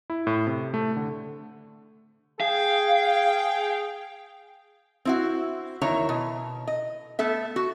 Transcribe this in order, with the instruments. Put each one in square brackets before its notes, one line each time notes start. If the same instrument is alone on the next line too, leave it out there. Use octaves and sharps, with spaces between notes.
[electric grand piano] E4
A2
C3
A3
D3
[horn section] G#4 G5 [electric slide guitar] F5
[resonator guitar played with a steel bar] C4 E4 F#4
E2 D#3 E4 C#5 A#5
B2
D#5
A3 B3 A4 E5
F#4